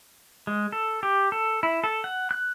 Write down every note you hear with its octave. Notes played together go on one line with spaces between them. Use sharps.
G#3
A4
G4
A4
E4
A4
F#5
F#6